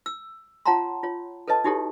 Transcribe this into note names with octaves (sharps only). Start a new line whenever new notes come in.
E6
F4 C#5 F#5 A5 A#5 C6
F4 C#5
A4 B4 C#5 D#5 A5
D#4 E4 F#4 G4 A4 C#5